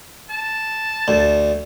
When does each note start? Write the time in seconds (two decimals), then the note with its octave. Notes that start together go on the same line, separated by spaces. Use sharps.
0.30 A5
1.08 D2